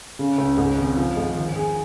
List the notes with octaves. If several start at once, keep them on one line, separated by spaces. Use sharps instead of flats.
C#3
C#2
G#2
G#1
F3
G#2
D#3
G#4